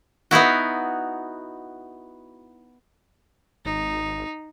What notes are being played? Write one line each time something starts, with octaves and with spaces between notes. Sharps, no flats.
B3 D#4 E4 F#4
G#1 D#4